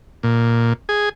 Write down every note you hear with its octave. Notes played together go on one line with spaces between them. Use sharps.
A#2
G#4